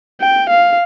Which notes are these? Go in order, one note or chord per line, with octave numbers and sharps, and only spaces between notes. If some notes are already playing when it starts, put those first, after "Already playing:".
G5
F5